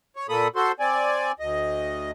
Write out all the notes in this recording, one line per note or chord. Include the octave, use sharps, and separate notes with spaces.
C#5
A#2 A#3 A4 B5 D#6
F#4 A4 C5 C6
C4 D5 G#5
D2 D#5